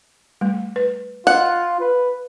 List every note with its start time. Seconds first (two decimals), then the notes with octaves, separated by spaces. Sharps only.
0.41 G3 A3
0.76 B4
1.27 F4 D#5 F#5
1.81 B4